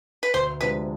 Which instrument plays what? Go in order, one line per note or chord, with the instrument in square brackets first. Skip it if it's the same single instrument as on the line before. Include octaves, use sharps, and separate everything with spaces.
[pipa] B4
[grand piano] D2 [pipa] C5
[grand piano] C3 F3 G#3 D4 [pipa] B4